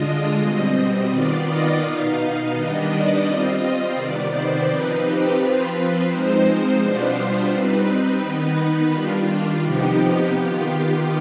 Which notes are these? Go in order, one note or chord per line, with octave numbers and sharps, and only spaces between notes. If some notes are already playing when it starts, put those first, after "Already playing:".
Already playing: D3 G#3 D4 F4 D#5
B2 G3 C4
D#3 B3 F4 D5
D#5
B2 B3 D#4 F5
D#3 G3 B3 D4 D#5
D5
G3 C4 F4 D#5
C3 D#3 B3 D5
C5
F3 C4 D#4 B4
G4
F3 C4 F4 B4
F3 G#3 C4 D#4 C5
B2 G3 B3 D4 F4
G3 C4 D#4 B4
D#3 B3 D#4
D#3 G3 D4 F4
C3 F3 B3 D#4 G4
D#3 B3 F4